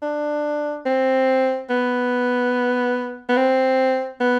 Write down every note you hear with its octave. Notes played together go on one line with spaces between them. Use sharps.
D4
C4
B3
B3
C4
B3